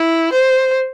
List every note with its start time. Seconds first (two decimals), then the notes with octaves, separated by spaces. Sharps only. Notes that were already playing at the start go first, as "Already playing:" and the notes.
Already playing: E4
0.33 C5